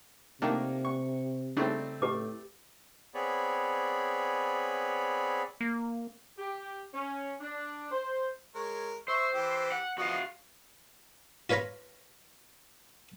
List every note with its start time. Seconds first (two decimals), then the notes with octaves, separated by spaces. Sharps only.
0.42 C3 D#3 A3 A#3 D4
0.85 C#6
1.57 C#3 G3 A3 C4 D4 D#4
2.02 A2 G4 B4 D6
3.15 B3 C4 G#4 C#5 D5 B5
5.60 A#3
6.38 G4
6.94 C#4
7.40 D4
7.91 C5
8.55 G#3 A#4 C#5
9.08 C5 E5 C#6 E6
9.34 E3 G4 E6
9.72 F#5
9.98 F3 B3 F#4 D#5 F5
11.50 F4 B4 C#5 F5 A#5 B5